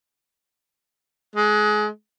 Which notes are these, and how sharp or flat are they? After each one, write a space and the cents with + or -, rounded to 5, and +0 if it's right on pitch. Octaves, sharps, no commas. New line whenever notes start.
G#3 +25